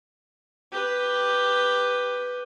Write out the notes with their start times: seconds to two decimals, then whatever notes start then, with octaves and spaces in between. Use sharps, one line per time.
0.72 G4 B4